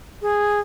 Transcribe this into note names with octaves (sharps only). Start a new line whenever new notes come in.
G#4